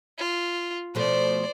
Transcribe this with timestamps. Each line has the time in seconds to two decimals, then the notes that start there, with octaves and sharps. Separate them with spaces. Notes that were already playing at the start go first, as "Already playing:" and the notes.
0.18 F4
0.95 B2 F3 A3 C5 D5